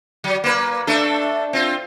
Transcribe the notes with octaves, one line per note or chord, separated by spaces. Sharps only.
F#3
A#3 B4
A3 D4 A4
C4 F4